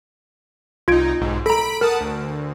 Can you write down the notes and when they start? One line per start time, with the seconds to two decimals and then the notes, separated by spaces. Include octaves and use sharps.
0.88 C2 D#4 F4 G#6 D7
1.21 B1 G#2
1.46 A4 A#5 B5 B6 D7
1.81 A#4 F#5 A5 D#6
2.01 D2